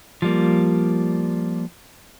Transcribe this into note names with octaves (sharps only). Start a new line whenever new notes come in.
F3 G3 A#3